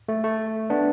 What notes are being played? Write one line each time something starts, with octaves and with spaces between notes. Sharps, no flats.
A3
A3
B3 D4